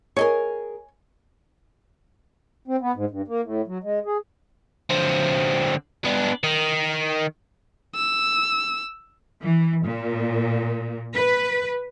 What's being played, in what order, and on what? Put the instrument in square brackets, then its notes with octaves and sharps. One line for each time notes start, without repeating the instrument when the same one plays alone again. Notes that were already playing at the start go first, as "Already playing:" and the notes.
[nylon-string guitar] G#4 A#4 [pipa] C#5 D#5 G#5
[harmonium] C4
B3
G#2
G2
A#3
A2
F#3
G#3
G#4
[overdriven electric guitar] D3 C4
B3 D4
D#3
[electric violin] E6
[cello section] E3
A#2
B4